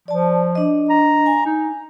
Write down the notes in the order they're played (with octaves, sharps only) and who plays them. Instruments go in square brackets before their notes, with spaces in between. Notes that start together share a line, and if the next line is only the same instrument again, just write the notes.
[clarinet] F3 [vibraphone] D5 A5
[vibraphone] D4 D#5
[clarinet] A#5
[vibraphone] G#5
[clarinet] D#4